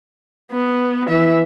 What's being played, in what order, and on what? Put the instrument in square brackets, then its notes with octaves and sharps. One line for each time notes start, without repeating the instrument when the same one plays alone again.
[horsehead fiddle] B3
[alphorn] E3 [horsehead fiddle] E5